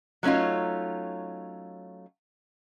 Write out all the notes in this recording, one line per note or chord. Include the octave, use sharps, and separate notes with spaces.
F#3 A3 C#4 D#4 F4